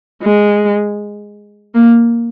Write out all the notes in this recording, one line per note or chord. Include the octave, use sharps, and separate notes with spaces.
G#3
A#3